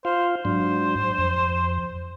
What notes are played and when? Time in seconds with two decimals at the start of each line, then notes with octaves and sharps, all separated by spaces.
0.05 F4 C5 F5
0.45 G#2 F#3 D4 C5
1.18 F2